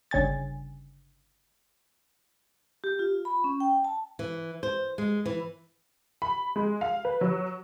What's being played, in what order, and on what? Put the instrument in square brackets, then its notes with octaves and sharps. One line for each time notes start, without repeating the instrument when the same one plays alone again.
[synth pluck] G1 C#3 G#5 A6
[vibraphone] G4
F4
B5
C#4
G5
A5
[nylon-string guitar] E3
C5
G#3
E3
[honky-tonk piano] B5
G#3
F5
B4
F#3